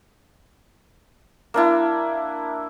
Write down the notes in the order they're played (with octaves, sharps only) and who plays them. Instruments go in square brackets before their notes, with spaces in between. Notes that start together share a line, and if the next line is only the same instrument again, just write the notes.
[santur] A#3 D4 E4